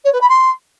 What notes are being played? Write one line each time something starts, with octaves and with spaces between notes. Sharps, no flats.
C#5
B4
B5
C6